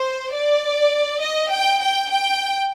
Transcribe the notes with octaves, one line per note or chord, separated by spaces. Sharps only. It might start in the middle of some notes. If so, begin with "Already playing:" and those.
Already playing: C5
D5
D#5
G5
G5
G5